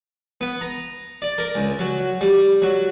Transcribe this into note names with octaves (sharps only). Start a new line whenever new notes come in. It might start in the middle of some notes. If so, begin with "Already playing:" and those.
B3
A#5
D5
A#4
C#2
F#3
G3
F#3